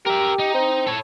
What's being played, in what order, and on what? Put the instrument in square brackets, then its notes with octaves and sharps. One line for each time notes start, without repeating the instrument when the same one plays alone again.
[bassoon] G4 [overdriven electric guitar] A#4 E5
[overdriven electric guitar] D#4
[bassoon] C4
[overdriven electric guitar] A4 C#5